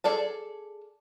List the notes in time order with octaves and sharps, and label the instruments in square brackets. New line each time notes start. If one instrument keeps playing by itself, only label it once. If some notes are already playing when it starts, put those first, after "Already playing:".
[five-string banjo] G#4 A4 D5 A5